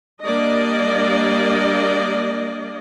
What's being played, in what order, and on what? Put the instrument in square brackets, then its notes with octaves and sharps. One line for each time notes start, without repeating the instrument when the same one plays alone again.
[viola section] G3 A#3 D4 D5 D#5